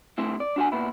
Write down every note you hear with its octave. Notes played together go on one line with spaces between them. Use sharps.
C3 A3 C4 E4
D5
D4 F#4 C#5 G#5
A#2 B3 E4